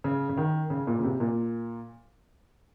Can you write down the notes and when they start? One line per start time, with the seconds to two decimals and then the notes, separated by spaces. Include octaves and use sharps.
0.04 C#3
0.29 C#3
0.37 D#3
0.70 C#3
0.87 A#2
0.99 C#3
1.04 C3
1.20 A#2